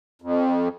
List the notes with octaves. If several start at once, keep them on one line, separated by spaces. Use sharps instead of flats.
F2